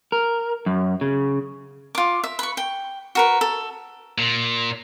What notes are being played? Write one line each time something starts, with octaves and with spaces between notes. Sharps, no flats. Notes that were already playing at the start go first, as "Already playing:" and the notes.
A#4
F#2
C#3
F4 D6
E5
B4 C#6
G5
F#4 A#4 B4
A4
A#2